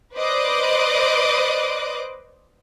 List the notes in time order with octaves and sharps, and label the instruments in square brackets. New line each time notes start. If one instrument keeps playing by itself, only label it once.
[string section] B4 C5 D5 D#5 D6 F#6